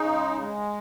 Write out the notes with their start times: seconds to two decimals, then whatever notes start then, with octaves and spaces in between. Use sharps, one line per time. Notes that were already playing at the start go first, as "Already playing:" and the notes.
Already playing: C#3 D#4
0.11 G#3
0.41 G#3